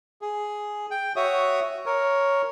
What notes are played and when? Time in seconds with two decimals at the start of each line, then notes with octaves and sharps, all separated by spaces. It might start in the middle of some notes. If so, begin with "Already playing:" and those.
0.22 G#4
0.91 G5
1.16 F#4 C#5 E5 D#6
1.86 A#4 C#5